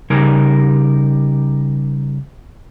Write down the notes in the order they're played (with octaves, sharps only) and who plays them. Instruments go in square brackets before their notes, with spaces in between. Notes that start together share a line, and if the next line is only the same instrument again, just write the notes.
[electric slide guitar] C#3 G3 D#4 G4 A#4 G#5